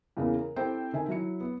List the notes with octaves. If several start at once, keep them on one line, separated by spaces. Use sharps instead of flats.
E2 C#3 E3 A#3
A#4
C4 E4 G4 A4 C5 G5
D3 D#3 E5 G#5
F#3 E4 C#7
B3